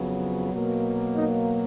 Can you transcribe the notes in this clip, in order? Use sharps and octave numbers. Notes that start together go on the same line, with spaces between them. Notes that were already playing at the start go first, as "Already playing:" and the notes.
Already playing: F2 C#3 F#3 B3
B2 F#3 A#3
D#4